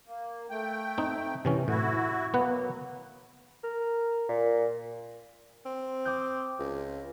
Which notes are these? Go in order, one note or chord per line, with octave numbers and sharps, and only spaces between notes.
A#3
A3 G5
C4 D#4
C3 E3 C#4
A2 E4 F#4
F#3 A#3 B3 B4 F#5
A#4
A#2
C4
D6 D#6 G6
C#2